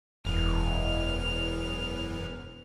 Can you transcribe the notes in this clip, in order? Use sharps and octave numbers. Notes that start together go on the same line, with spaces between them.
E1 F#2 E3 B3 F6